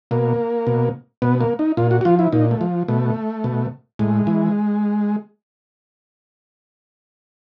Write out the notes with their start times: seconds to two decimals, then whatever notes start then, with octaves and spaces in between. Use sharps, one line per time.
0.11 B2 A#3
0.67 B2
1.22 B2 B3
1.41 A#3
1.59 D#4
1.77 A#2 F4
1.91 F#4
2.01 F#4
2.05 F3 F4
2.19 E4
2.32 A#2 D#4
2.51 A3
2.61 F3
2.88 B2 A3
3.44 B2
3.99 A2 G#3
4.27 E3